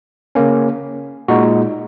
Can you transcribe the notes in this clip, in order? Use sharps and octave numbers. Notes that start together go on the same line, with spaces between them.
C#3 A#3 C#4
A#2 G#3 D#4 F#4